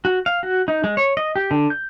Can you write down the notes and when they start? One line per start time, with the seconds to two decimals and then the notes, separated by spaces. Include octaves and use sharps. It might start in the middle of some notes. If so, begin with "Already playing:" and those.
0.05 F#4
0.26 F5
0.43 F#4
0.68 D#4
0.84 G#3
0.97 C#5
1.17 D#5
1.36 G4
1.51 D3
1.70 G6